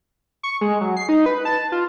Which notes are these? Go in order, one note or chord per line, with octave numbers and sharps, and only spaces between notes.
C#6
G#3
F#3
C7
D#4
B4
A5
F4